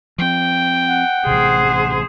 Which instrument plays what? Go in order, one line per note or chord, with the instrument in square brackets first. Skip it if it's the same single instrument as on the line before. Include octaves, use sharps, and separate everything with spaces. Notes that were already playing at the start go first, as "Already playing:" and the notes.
[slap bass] F3 C4 [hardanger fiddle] G5
[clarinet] F#5
[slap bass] A1 C3 [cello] G#4 C5